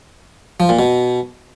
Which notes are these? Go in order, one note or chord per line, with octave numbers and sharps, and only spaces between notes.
F3
A#2
B2